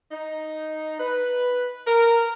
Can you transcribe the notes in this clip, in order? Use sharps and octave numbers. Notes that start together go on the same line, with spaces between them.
D#4
B4
A#4